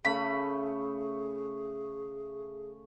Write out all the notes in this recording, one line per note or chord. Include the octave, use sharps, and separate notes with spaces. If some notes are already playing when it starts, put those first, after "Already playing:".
C#3 A3 G#4 B5